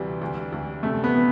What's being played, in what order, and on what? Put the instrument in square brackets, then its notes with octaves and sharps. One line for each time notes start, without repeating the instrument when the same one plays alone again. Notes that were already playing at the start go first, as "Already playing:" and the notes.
Already playing: [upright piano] D2 C3 E3 [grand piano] G3
[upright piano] D2
D2
[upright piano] C3 [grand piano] A3
[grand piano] B3
[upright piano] E3